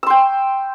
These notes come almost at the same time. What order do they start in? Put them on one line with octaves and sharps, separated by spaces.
E6 C6 G5